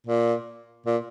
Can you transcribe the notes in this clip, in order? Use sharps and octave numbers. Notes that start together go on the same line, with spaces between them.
A#2
A#2